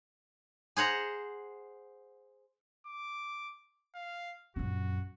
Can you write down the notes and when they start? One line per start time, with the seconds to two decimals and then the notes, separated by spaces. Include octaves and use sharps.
0.77 G#4 C5 F#5 A#5
2.87 D6
3.95 F5
4.56 A#1 F#2 F#4